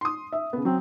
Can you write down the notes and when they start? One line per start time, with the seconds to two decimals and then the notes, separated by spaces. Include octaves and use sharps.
0.01 C6 D#6
0.33 E5
0.53 C#3 B3
0.65 F#3 C4